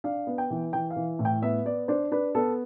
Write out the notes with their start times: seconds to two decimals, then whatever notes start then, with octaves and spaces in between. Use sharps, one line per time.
0.04 D4 F5
0.27 B3
0.38 G5
0.50 E3
0.73 E3 G5
0.90 F5
0.96 E3
1.19 A2
1.25 G5
1.42 B3 E5
1.65 B3 D5
1.88 D4 C5
2.12 D4 B4
2.35 B3 A4